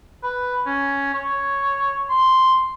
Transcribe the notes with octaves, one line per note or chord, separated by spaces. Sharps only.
B4
C#4
C#5
C6